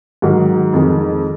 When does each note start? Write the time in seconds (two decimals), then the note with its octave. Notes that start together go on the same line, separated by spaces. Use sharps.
0.22 G#2 D#3 F#3
0.73 F2 D#3 G#3